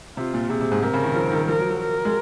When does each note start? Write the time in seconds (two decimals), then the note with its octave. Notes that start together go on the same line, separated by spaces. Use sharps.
0.17 C3 F4
0.34 A#2
0.49 C3 G#4
0.61 C3
0.72 G#2
0.82 C3 A#4
0.93 C#3
1.04 D#3
1.15 F3
1.32 D#3
1.48 F3 A#4
1.59 F#3
1.70 F#3
1.81 A#4
2.05 G#3